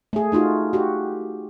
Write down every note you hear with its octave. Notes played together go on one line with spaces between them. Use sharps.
A3 G#4
A3 D#4 F4 F#4
F#4 G4